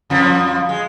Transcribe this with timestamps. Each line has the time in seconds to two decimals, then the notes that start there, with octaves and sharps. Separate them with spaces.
0.10 F2 F3
0.69 G#3